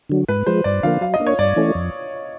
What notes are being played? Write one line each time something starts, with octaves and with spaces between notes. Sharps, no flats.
D3 F#3
G#2 B4
F3 G#3 C5
G2 D5
D3 F3 A#3 F5
F#3 F5
D#5
A#3 D4
C#5
G2 D5
E3 A3 C#4
F2